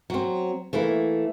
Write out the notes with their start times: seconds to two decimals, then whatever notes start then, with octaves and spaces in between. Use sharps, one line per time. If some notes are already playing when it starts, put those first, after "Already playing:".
0.10 F#3 C4
0.73 E3 A3 A#3 E4